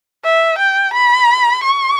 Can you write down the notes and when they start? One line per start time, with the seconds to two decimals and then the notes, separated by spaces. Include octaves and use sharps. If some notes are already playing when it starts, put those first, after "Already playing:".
0.24 E5
0.58 G5
0.93 B5
1.63 C#6